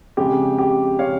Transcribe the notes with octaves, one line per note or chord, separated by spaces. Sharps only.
F2 C#3 G#3 G4
G4
C#3 G#3 C#5 F5